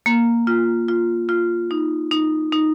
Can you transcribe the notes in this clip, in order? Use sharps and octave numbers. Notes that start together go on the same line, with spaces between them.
A#3
F4
F4
F4
D#4
D#4
D#4